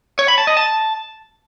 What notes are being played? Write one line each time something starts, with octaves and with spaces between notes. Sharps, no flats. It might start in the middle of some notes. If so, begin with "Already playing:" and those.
C#5
B5
A5
D#5
A5